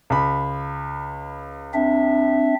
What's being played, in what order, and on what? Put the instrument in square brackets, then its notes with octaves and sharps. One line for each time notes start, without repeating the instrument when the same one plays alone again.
[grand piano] C#2 B5
[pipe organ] C4 D4 E5